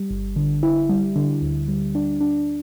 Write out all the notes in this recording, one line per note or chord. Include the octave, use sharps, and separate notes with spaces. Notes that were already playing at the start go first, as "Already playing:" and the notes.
Already playing: G3
G1
D3
E4
G3
D3
D2
G3
D4
D4